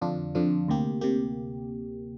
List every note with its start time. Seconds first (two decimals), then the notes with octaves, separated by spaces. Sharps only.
0.01 F2 D3 F3 D4 F4
0.35 F2 D3 F3 D4 F4
0.68 D2 C3 A#3 G4
1.01 D2 C3 A#3 G4